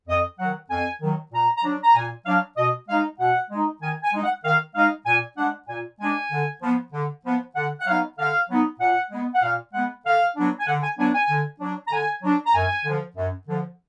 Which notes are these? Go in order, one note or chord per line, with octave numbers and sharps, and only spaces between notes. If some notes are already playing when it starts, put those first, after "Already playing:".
F2 D#5
D#3 F#3 F#5
F2 G#5
D#3 F#3
A#2 A#5
A#5
F#3 D4
A#5
A#2 G#5
F#3 D4 F5
B2 D#5
G#3 D#4 F5
B2 F#5
G#3 D#4
D#3 G#5
G#5
G#3 D#4
F#5
D#3 F5
G#3 D#4 F5
A#2 G#5
G#3 D4 F#5
A#2 G#5
G#3 D4 G#5
D3
F3 B3
D3
F3 B3
D3 F#5
F#5
F#3 B3 D#4 F5
D3 F5
F#3 B3 D#4
A#2 F#5
G#3 B3
F#5
A#2 F5
G#3 B3 F#5
D3 F5
F#3 B3 D4
G#5
D3 F#5
G#5
F#3 B3 D4 G#5
G#5
D3
F#3 D4
A#5
D3 G#5
F#3 D4
A#5
F#2 G#5
D3 F3
F#2
D3 F3